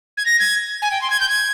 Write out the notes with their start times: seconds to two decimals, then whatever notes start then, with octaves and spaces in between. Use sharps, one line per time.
0.17 G#6
0.26 A#6
0.39 G#6
0.82 G#5
0.91 G5
1.01 C6
1.10 G#6
1.20 G6
1.29 G#6